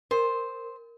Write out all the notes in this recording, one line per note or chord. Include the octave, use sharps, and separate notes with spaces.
A#4 C5